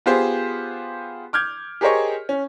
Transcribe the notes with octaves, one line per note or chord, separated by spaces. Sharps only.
B3 F4 G4 G#4 C5
D6 F6 G6 G#6
G4 G#4 A#4 C5 C#5 D#5
C#4